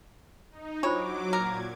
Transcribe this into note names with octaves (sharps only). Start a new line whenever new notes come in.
D#4
F#3 D4 F4 C5 C#5 D6
A#2 A#4 G#6